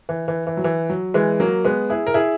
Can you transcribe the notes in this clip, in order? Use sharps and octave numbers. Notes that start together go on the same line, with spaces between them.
E3
E3
E3
F#3
E3
F#3
E3 G#3
F#3 A#3
G#3 B3
E4 G#4
A#4
E4 G#4